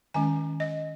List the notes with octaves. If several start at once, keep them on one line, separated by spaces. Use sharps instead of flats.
D#3 G#3 C#4 G#5
D#5